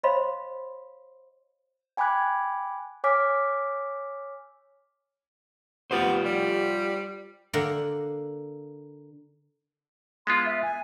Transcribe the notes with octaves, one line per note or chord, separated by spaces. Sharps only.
C5 C#5 D#5 F5 B5 C6
G5 G#5 B5 D6 F#6 G#6
C#5 G#5 D6 E6 F6 B6
B3 F4 G4 C5
G3
D3 A#3 A#4 F#5 G5
G#3 B3 F4 C6
E5
G#5